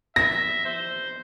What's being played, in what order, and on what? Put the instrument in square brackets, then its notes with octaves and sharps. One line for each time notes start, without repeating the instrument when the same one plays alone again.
[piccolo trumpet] E5 [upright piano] A#6
[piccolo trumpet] C5